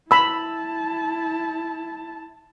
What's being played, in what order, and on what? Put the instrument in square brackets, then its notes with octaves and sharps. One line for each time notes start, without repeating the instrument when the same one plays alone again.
[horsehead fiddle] E4 A5 [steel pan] B5 E6